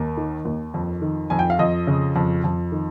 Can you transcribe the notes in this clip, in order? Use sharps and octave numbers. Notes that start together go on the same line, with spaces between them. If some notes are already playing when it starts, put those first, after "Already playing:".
Already playing: D#2 A#4
D#3
D#2
F2
D#3
F2 G#5
G5
F5
F2 D#5
C#3
F2
F2
D#3